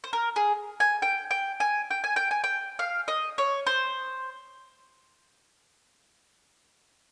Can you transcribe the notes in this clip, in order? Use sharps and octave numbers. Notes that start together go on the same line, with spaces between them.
C5
A#4
G#4
G#5
G5
G5
G#5
G5
G#5
G5
G#5
G5
F5
D#5
C#5
C5